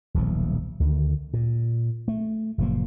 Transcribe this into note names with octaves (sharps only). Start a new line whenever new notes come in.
D#1 B1 F3
D2 D3 D#3
A#2
A3
F#1 A#2 F3 A#3